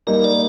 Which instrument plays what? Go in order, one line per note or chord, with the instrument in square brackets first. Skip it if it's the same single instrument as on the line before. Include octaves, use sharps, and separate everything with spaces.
[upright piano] G3 A#3 D#4 [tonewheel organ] A#4
[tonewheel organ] D5